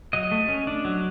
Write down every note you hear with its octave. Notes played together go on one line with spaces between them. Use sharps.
F#3 D#5
A3
C#4
D4
F#3